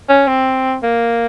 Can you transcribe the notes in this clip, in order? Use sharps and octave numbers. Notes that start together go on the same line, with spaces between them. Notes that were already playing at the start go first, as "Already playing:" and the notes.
C#4
C4
A#3